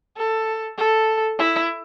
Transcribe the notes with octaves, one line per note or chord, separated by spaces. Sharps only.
A4
A4
E4